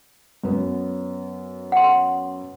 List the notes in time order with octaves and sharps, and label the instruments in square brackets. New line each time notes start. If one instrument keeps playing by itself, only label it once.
[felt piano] F#2 B3
[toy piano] F#5 C6